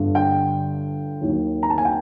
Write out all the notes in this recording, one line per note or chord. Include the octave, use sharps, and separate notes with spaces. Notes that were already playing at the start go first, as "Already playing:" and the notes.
Already playing: G1 G2 D3
G5
D#2 D#3 F#3
A#5
A5
G#5
G5